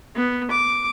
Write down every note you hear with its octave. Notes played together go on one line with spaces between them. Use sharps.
B3
D6